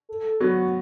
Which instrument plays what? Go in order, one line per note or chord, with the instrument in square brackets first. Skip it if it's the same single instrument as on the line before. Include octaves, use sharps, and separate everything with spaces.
[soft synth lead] A4
[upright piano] F#3 B3 [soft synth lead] F#4